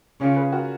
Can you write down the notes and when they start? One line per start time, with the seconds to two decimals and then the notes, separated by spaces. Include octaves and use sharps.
0.20 C#3 C#4 F4
0.36 G#4 B4
0.52 F#4 A#4